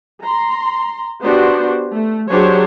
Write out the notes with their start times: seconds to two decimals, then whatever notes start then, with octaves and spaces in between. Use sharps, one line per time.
0.22 A#5 C6
1.22 B3 D4 F#4 G4 C5
1.92 A3
2.31 F#3 D4 G4 G#4 C5 C#5